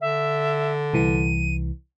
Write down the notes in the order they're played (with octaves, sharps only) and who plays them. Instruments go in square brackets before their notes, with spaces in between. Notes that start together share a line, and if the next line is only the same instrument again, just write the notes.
[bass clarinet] D3 [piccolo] E5
[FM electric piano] C2 E3 [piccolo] D#7